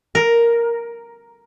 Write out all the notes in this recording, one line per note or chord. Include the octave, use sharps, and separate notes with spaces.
A#4